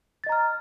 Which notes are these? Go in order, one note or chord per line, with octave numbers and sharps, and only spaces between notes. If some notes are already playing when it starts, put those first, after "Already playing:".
D#5 A#5 F6 A6